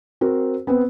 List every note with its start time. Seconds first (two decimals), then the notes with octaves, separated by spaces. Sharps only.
0.21 C4 F#4 A#4 C5
0.67 B3 C4 B4